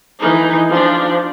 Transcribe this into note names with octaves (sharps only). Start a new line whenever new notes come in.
E3 D#4
F3 D4